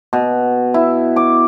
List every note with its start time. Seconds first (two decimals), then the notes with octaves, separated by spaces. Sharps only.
0.13 B2
0.74 E4
1.16 D6